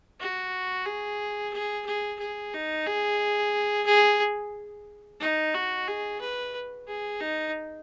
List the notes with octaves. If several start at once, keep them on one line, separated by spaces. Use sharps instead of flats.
F#4
G#4
G#4
G#4
G#4
D#4
G#4
G#4
D#4
F#4
G#4
B4
G#4
D#4